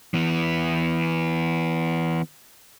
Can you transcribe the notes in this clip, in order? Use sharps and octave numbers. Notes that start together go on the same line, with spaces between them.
E3 B3